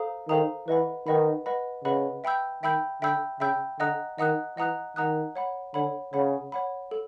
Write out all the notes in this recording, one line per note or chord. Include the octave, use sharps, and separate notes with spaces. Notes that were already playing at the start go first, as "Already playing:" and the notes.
Already playing: A4 C5 F5 A#5 D#6
D#3 A4 C5 F5 A#5 D#6
E3 B4 D#5 F#5 B5
D#3 B4 D#5 F#5 B5
B4 D#5 F#5 B5
C#3 B4 D#5 F#5 B5
E5 G5 B5 E6 G6
D#3 E5 G5 B5 E6 G6
D3 E5 G5 B5 E6 G6
C#3 E5 G5 B5 E6 G6
D3 D#5 F#5 A#5 D#6 F#6
D#3 D#5 F#5 A#5 D#6 F#6
E3 D#5 F#5 A#5 D#6 F#6
D#3 D#5 F#5 A#5 D#6 F#6
C#5 F#5 B5
D3 C#5 F#5 B5
C#3 C#5 F#5 B5
C#5 F#5 B5
A4